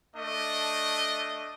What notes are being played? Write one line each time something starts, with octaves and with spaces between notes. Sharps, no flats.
A3 D4 D#5